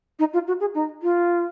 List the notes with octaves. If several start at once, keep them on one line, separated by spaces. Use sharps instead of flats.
D#4
F4
F#4
G#4
D#4
F4